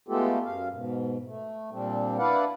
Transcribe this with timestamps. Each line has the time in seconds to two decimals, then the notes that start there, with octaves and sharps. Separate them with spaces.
0.08 G#3 A3 B3 F4 G4 A4
0.45 F#2 F5
0.72 G#2 B2
1.25 A3
1.71 A#2 G3 C4 D4
2.18 D4 E4 B4 D5 F5 F#5